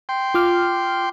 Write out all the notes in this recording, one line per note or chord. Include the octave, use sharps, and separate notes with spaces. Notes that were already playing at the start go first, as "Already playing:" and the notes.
G5 C6
F4 D6 F6